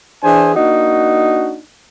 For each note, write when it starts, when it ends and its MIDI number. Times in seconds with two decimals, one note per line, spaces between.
0.23 0.51 52
0.23 0.51 62
0.23 0.51 68
0.23 0.51 72
0.23 0.51 80
0.54 1.58 58
0.54 1.58 62
0.54 1.58 63
0.54 1.58 66